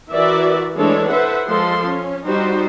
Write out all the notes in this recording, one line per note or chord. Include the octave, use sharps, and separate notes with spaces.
E3 F#4 A#4 D5 E5
E3 G#3 A3 D4 A4 C#5
A4 B4 C5 E5 F#5
F3 G#3 A4 C6
C#4
G3 D#4 F#4 C5